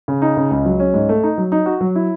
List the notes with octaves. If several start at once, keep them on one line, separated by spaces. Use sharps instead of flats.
C#3
D#4
C#3
C#2
F#3
C#4
G#2
A3
D#4
F#3
D#4
F#4
F#3
E4